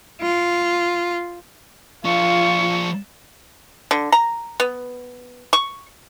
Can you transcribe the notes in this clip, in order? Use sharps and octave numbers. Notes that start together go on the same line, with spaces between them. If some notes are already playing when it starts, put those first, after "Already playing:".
F4
F3 D4 F4 C#6
D3
A#5
B3
C#6